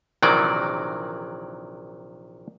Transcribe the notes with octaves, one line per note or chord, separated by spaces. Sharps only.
A#1 C3 D#3 E3 F#3 D5